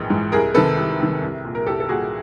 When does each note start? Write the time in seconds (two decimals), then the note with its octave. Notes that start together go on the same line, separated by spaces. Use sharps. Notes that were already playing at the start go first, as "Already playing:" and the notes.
Already playing: A#1 G#2 E3 G#4
0.10 G#2 E3
0.32 C2 G#4 A#4
0.54 C3 D#3 A4 B4
0.77 C2
1.00 C3 D#3
1.22 C2
1.45 A#2
1.55 A#4
1.66 C2 G4 A4
1.80 A4
1.89 A#2 F#4 G#4